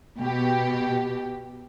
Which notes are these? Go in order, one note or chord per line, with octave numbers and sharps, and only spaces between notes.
B2 G4